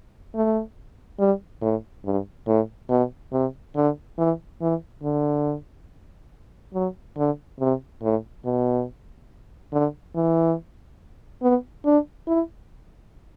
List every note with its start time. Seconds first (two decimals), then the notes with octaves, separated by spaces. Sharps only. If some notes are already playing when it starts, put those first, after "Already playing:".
0.35 A3
1.19 G3
1.61 A2
2.05 G2
2.47 A2
2.89 B2
3.32 C3
3.76 D3
4.18 E3
4.61 E3
5.03 D3
6.74 F#3
7.17 D3
7.60 C3
8.02 A2
8.45 B2
9.72 D3
10.15 E3
11.42 B3
11.85 D4
12.27 E4